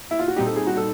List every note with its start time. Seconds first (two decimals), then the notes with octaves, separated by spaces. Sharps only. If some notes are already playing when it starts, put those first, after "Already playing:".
0.11 E4
0.19 F4
0.28 F#4
0.36 A#2 G3 C4 D#4 G4
0.46 A4
0.56 G#4
0.67 F#4
0.77 A4